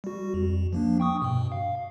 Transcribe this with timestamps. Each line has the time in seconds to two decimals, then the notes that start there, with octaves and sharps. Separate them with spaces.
0.04 G3 F#4
0.34 F2
0.73 F3 A#3 D4
1.00 G5 C#6 D#6
1.22 G2 B2
1.52 F5